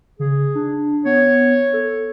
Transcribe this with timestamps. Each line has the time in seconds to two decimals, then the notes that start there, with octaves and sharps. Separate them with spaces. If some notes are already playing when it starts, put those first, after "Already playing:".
0.19 C#3 G#4
0.55 D4
1.05 B3 C#5
1.73 A4